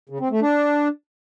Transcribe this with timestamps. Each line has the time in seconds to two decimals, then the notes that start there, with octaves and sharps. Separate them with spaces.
0.09 C#3
0.20 C4
0.31 A3
0.41 D4